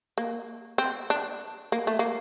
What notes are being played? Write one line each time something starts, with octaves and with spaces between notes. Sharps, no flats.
A#3
C4
D4
A#3
A3
A#3